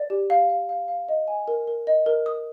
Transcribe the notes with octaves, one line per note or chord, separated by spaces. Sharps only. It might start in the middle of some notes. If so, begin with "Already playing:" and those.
Already playing: D5
G4
F5
F5
F5
F5
D#5
G#5
A#4
A#4
D#5
A#4
D#6